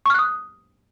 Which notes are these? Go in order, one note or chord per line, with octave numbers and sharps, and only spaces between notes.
C#6 D#6 F6 F#6